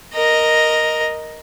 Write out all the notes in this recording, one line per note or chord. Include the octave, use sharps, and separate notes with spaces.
A#4 D#5